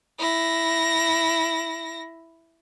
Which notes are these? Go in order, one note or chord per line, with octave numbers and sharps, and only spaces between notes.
E4 A#6